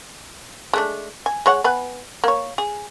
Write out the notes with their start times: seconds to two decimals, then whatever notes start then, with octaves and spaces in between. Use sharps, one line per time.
0.73 G#3 A3 D4
1.26 G#5
1.46 G#3 C#5 F#5
1.64 B3 B4 G#5
2.24 A#3 C#5
2.58 G#4